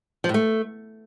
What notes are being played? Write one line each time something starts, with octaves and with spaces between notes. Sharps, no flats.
F3
A2
A3